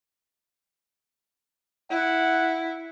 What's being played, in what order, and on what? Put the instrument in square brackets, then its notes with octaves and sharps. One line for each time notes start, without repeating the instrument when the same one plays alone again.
[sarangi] E4 [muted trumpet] F#5